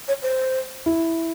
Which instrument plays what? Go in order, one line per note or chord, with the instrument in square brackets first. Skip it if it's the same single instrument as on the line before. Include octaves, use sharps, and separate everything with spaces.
[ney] C#5
C5
[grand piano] E4